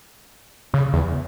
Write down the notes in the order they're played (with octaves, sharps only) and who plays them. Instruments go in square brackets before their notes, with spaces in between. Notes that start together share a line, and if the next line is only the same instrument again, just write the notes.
[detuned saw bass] C#3
E2